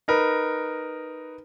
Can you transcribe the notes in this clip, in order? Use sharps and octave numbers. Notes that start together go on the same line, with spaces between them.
D#4 A#4 B4